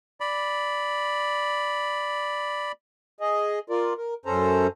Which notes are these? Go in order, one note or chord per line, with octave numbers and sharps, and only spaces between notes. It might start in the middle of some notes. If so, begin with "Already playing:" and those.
D5 B5
G#4 D#5
F4 A#4 D5
A#4
F#2 C#4 A4 C5 A#5